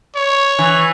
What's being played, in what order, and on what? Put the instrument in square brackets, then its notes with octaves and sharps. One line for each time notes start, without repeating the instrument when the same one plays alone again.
[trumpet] C#5
[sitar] E3